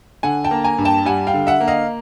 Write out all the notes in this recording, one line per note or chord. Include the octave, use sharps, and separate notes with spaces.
D3 F#5 G#5
G5 A5
A#3
G#5 A#5
G2
G5 A5
G3 F#5 G#5
F5 G5
D3
E5 F#5
A#3
D#5 F5